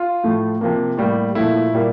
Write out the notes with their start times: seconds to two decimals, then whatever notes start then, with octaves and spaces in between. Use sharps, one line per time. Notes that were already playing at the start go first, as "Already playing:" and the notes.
Already playing: F4
0.24 A2 F3 A3
0.61 C3 F3 A#3
0.98 A2 G3 A#3
1.35 A#2 F3 A3 E4
1.73 A#2 G3 A#3